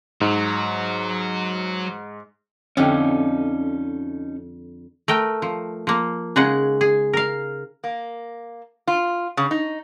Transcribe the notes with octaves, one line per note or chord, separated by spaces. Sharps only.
G#2 F#3
F2 D3 C#4 D#4 G4
A3 A#4 G5
F3
F3 A#3
C#3 G#3 D#4 G#4 F#5
G#4
A#4 F5
A#3
F4
C#3
D#4